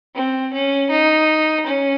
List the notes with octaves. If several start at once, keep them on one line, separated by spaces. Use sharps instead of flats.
C4
C#4
D#4
C#4